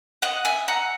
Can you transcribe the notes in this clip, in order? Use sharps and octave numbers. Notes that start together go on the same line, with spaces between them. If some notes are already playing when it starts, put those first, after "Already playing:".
D#5 F#5
E5 G#5
F#5 A#5